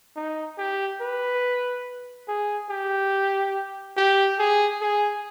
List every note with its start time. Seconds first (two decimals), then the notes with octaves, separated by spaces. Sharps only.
0.16 D#4
0.58 G4
1.01 B4
2.28 G#4
2.70 G4
3.97 G4
4.39 G#4
4.81 G#4